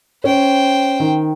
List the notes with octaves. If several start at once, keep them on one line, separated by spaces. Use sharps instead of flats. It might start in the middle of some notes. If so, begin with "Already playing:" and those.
C#4 C5 G5
D#3